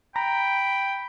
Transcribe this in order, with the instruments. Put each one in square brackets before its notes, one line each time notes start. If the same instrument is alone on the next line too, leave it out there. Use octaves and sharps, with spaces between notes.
[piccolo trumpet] G5 [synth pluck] A#5 [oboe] B5